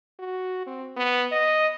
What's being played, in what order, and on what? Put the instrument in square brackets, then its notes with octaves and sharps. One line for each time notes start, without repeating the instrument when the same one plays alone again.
[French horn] F#4
C4
B3
D#5